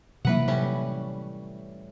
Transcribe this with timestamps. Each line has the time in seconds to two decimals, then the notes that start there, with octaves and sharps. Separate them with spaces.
0.25 C3 E3 F#3 A#3 B4 F#5
0.48 A2 G3 C#4